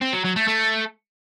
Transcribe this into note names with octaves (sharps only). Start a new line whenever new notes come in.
C4
F#3
F#3
A3
A3